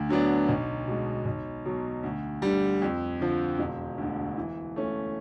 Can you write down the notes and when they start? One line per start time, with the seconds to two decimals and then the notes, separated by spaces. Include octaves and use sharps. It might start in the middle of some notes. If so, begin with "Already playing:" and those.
Already playing: D2
0.09 D3 F#3 B3 D4
0.49 B1
0.87 B2 G#3
1.26 B1
1.66 B2 F#3
2.03 D2
2.42 D3 G3
2.82 F2
3.20 D3 F3
3.59 E1
3.98 D2 D3
4.37 E3
4.76 A3 C#4